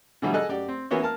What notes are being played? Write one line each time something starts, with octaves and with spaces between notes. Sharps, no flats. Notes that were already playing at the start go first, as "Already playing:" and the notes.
B2 D3 E3 F#3 G3
G#4 A4 D#5 F#6
F#2 G4 D5
C4
E3 A#3 B3 C#4 F#4
A#3 A5 F6